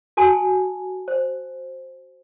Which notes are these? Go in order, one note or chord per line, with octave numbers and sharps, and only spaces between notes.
F#4 A4 G#5 A5 C6
C5